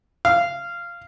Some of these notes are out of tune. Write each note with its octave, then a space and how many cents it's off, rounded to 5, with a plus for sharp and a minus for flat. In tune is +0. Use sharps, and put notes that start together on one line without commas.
F5 -15